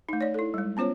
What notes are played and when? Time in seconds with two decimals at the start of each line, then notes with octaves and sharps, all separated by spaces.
0.09 A3 D#4
0.21 C#5 D5
0.34 E4 A4
0.54 G3 G#3
0.77 B3 C#4 F4 C5 C#5